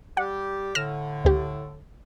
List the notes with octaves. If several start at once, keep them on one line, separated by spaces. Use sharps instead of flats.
G3 G4 F#5
A2 D3 F6 A#6 E7
D2 G4